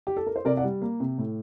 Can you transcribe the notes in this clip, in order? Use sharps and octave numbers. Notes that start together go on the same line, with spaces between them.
G4
A4
A#4
C5
C3 A#4 D5
D5 F#5
G3
A#3
C3
A2